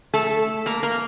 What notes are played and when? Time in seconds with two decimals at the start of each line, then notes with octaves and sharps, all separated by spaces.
0.14 A3 A4
0.66 A#3 A#4
0.83 A#3 A#4